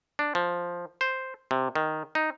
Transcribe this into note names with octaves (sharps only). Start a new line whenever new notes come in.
D4
F3
C5
C3
D#3
D#4